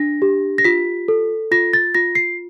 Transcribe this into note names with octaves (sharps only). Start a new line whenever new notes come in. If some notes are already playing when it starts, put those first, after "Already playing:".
Already playing: D4 A#6
G4
A#6
F4 B6
A4
F4 A#6
A6
F4 A#6
C7